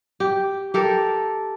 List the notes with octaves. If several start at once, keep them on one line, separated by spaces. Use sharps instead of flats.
G4
G4 A4 A#4